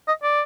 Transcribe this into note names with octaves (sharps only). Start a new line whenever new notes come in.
D#5
D5